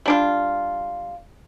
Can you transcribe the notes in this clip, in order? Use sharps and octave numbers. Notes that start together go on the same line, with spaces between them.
G3 D4 F4